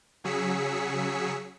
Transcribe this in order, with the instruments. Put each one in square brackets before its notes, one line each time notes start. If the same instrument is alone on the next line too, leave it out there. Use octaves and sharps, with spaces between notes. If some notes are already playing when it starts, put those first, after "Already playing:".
[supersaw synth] C#3 F#3 G#4 E6 B6 C#7